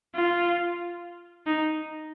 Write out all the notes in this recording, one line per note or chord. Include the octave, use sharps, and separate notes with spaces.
F4
D#4